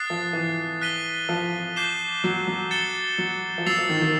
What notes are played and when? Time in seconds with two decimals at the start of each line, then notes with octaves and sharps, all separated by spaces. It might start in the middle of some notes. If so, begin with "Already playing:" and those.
Already playing: D#6 F#6 A6 C7
0.10 F3
0.33 E3
0.81 F#6 B6 D#7 G7
1.29 F3
1.76 D6 G6 C7 E7 G7
2.24 F#3
2.47 F#3
2.71 A6 C#7 E7 G7
3.18 F#3
3.58 F3
3.66 F#3 E6 A6 C7 F7
3.78 F3
3.89 D#3
4.01 D#3